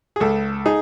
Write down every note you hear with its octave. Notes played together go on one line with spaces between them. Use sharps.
G#4
C#2 A4
D#4 G#4